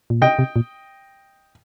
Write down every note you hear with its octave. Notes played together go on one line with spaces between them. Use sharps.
A#2
C3 D#5 G5
C3
A#2